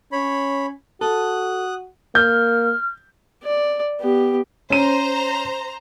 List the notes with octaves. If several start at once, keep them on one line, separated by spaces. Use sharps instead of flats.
C#4 C#5 B5
F#4 A4 D#6 F#6
A#3 F6 G6
D5
B3 G4
C#4 C5 A#5 D#7